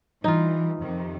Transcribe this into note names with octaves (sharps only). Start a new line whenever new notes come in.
E3 G3 D#4 F4
F2 C3 D#3